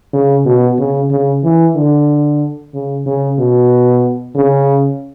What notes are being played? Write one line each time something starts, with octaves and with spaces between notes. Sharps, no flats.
C#3
B2
C#3
C#3
E3
D3
C#3
C#3
B2
C#3